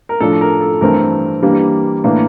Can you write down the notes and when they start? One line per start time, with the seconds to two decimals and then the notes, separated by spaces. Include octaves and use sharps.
0.09 A#4
0.20 A2 F3 A3 D4 A4
0.41 A#4
0.61 A4
0.81 G2 E3 A3 C4 A#4
1.42 G2 E3 G3 A#3 D4
2.04 A2 E3 A#3 D4